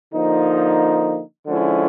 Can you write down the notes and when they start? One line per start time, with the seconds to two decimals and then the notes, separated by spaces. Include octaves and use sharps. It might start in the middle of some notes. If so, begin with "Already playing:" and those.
0.11 D3 F3 A#3 D#4
1.47 D3 F3 G#3 C#4 E4